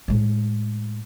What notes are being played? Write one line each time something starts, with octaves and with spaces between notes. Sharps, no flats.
A2 G#3